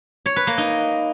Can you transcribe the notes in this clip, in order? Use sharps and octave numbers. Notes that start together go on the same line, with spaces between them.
C#5
B4
A#3
D#4